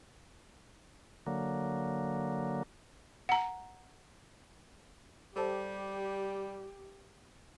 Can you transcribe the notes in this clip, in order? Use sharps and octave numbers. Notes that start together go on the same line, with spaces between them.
D3 F#3 A#3
F#5 A#5
G3 G4 A4 C5 A5